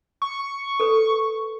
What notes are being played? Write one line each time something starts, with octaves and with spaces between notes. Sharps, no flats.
C#6
A4 B4